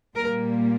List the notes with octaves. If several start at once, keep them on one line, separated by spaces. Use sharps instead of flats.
A#2 G3 A#3 A#4